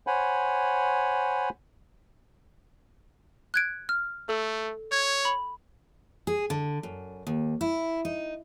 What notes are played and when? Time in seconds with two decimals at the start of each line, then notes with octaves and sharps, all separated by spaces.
0.07 C5 C#5 F#5 G#5 B5
3.54 F#6 G#6 D7
3.89 F6
4.29 A3 A4
4.92 C#5 G#6
5.25 B5
6.27 G#4
6.50 D3
6.83 F#2
7.27 D#2
7.61 E4
8.05 D#4